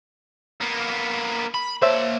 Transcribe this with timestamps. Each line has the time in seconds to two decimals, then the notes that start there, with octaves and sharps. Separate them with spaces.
0.61 A#3 B3
1.54 B5
1.82 A#3 C5 C#5 E5 A5